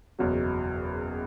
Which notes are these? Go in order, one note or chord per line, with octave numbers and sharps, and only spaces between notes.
F#1 E2 B2 F#3